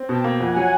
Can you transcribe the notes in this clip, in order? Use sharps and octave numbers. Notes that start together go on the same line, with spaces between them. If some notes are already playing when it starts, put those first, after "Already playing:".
Already playing: C4
B2 G5 A5
A#3
F2 F#5 G#5
F#3